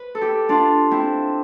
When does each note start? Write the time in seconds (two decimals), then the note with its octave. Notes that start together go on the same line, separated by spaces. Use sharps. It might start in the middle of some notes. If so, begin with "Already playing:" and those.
Already playing: B4
0.15 A4
0.21 E4 G4
0.49 D4 F4
0.91 C4 E4